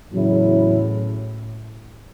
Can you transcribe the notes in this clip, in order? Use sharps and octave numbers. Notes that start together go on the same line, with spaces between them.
E2 A2 C#3 F#3 C#4 E4